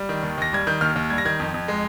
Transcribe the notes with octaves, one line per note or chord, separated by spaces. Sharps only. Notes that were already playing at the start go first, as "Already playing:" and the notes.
Already playing: G3
D#3
D#2
D#2 A#6
G3 G#6
D#3 G6
D#2 F6
D#2
G3 G#6
A#6
D#3 G#6
F2
F2
G#3